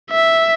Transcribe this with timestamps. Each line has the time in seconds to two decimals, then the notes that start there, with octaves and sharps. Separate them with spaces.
0.11 E5